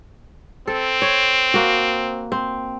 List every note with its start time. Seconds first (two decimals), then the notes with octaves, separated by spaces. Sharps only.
0.67 C4 A4
1.02 C#5
1.54 A#3 F#4
2.32 C4